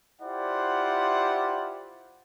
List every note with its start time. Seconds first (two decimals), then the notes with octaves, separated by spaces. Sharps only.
0.22 E4 F4 G4 C5 D5 F#5